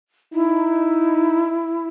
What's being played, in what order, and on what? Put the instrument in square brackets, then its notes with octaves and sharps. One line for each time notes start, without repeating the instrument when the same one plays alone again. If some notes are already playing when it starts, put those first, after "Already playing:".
[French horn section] D#4 [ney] E4